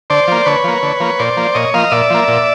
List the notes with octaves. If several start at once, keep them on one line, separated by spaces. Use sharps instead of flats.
D3 C5 D5
F3 A#3
D3 B4 C#5
F3 A#3
D3
F3 A#3
A#2 C5 D5
F3 A#3
A#2 C#5 D#5
F3 A#3 D#5 F5
A#2 D5 E5
F3 A#3
A#2